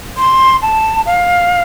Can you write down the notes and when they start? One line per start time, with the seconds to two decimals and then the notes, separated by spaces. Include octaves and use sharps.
0.17 C6
0.62 A5
1.06 F5